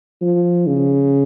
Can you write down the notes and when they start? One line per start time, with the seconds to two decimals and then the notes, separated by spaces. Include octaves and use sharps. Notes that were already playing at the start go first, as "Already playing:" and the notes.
0.22 F3
0.67 C#3